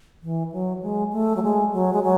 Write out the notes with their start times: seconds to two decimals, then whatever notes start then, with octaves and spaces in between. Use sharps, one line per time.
0.22 E3
0.52 F#3
0.82 G#3
1.12 A3
1.36 F#3
1.43 G#3
1.73 F#3
1.93 G#3
2.03 F#3